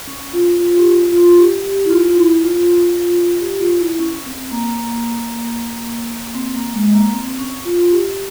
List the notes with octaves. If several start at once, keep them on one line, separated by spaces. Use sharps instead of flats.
C#4
F4
F4
G4
F4
F4
G4
G4
E4
F4
E4
F4
F4
G4
F4
E4
C#4
C4
A#3
C4
A#3
G#3
A#3
C4
C#4
F4
G4